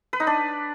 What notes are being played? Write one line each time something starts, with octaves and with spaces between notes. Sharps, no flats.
B4
D#4
D4